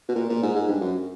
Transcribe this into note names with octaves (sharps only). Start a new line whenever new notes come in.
B2
A#2
A#2
G#2
G#2
G2
F#2